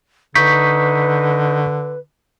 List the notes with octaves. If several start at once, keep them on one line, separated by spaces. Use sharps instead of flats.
D3 D#4 B4 C#6 G6 B6